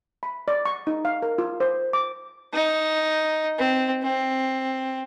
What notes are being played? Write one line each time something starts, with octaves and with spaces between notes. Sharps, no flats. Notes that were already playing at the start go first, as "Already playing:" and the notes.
B5
D5
C#6
D#4
F5
A#4
F4
C5
D6
D#4
C4
C4